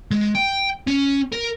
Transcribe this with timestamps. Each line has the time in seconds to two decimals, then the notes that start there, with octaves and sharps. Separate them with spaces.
0.11 G#3
0.35 G5
0.87 C#4
1.32 A#4